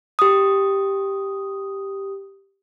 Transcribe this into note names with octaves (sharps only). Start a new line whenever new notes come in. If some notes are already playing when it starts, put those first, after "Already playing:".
G4 D#6